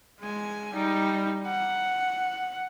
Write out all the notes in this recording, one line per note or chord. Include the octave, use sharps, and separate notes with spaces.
G#3 G#5
G3 D#4
F#5